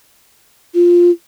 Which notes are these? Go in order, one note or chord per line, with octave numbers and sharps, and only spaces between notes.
F4